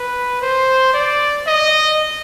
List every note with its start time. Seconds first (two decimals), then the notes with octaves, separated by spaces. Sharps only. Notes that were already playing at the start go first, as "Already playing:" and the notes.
Already playing: B4
0.42 C5
0.94 D5
1.47 D#5